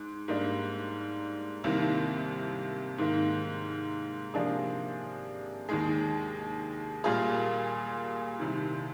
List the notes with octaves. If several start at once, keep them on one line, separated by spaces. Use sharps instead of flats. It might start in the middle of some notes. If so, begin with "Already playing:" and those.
Already playing: G#2
G#2 G3 A#3 D4
C2 C3 D#3 A#3
G#2 D#3 A#3
C3 F3 A#3 D4 G#4
D#2 D#3 G#3
A#2 G3 A#3 F4 G#4
C2 C3 D#3